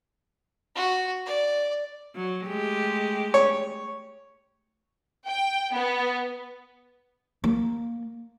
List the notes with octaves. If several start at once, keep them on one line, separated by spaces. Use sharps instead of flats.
F#4
D5
F#3
G#3 A3 G4
C#5
G5
B3
A#3